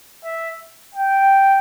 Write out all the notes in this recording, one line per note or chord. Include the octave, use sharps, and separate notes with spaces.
E5
G5